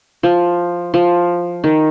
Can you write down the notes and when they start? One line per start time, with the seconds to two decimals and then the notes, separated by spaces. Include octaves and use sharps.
0.23 F3
0.94 F3
1.64 D#3